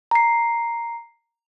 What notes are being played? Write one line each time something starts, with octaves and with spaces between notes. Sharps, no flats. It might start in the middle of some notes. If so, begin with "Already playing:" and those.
A#5 C7